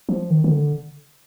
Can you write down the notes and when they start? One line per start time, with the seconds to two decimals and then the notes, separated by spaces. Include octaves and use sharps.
0.09 F3
0.30 D#3
0.44 D#3
0.51 D3